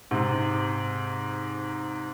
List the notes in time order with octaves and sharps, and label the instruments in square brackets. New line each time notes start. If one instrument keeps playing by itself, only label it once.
[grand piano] G#2 C3